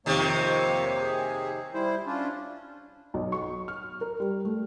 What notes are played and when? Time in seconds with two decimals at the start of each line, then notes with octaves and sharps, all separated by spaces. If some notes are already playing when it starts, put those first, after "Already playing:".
0.06 F2 C3 D#3 A#3 C#5
1.02 G#4
1.74 G3 E4 C5
2.06 C#4 D4 F4
3.14 B1
3.32 C#6
3.68 F6
4.01 A#4
4.20 G3
4.45 A3